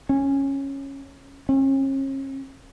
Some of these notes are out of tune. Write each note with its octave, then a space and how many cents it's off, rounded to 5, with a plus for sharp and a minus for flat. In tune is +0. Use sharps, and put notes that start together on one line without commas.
C#4 -10
C#4 -40